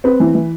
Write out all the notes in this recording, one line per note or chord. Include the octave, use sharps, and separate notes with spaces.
C4 B4
E3
E3